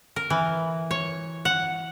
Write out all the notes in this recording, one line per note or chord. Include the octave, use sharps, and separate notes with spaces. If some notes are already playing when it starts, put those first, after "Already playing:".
A#4
E3
C#5
F#5